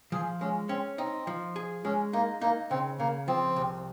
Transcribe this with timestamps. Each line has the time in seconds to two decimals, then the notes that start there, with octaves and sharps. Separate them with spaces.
0.12 F3 G#4
0.41 G#3 C#4
0.69 C4 C#4
0.98 C4 D#4
1.27 F3
1.56 G#4
1.85 G#3 C#4
2.13 A#3 D#4
2.41 A#3 D#4
2.71 C#3 C4
2.99 C#3 A#3
3.28 F3 C4
3.56 C2